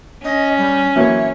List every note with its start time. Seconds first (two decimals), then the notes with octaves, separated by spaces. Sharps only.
0.24 C#4 D#5
0.58 G3
0.96 E3 F#3 A#3 C#5 E5